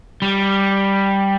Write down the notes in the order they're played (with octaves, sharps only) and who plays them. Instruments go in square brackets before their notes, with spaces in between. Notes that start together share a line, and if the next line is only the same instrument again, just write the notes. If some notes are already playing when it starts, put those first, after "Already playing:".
[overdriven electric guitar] G3